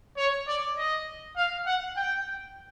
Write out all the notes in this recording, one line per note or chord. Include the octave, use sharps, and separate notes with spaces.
C#5
D5
D#5
F5
F#5
G5